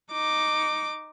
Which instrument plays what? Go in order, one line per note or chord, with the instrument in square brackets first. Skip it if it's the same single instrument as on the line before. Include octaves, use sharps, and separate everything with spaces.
[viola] D#4 D6